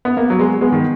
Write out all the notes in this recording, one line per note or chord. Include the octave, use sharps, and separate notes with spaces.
B3
A#3 B3
F#3
G#3 B3
G#3 B3
D#3